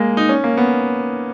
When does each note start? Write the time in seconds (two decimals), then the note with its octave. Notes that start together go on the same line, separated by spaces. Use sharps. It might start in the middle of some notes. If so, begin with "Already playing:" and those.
Already playing: G#3 A#3
0.17 D#4
0.29 C#4
0.44 A#3
0.57 B3